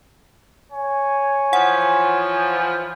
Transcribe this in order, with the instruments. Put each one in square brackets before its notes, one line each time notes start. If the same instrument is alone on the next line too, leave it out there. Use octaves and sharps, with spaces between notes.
[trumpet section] C#5 G#5
[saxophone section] E3 F3 [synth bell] F#5